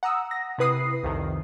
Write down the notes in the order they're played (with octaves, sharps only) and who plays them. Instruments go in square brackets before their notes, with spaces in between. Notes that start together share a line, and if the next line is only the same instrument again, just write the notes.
[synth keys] F#5 A#5 D#6 E6
A#6
C3 E4 B4 D#6 C7
C2 F2 D#3